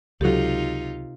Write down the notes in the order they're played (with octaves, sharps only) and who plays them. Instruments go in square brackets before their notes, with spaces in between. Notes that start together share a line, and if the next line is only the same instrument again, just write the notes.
[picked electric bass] C#2 F#3 [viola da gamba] C3 D#4 F4 [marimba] G4 A4